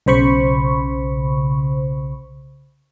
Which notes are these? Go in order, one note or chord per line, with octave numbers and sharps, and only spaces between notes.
B1 C#3 C5 B5 C#6